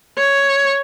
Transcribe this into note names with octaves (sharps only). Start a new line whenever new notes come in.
C#5